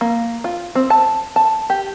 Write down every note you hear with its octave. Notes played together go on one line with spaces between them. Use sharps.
A#3
F4
C4
A5
A5
G4